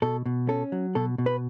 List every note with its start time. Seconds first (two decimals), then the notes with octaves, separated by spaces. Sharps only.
0.02 B2 A4
0.26 B2
0.49 C#4 A4
0.72 F#3
0.95 B2 A4
1.18 B2
1.26 B4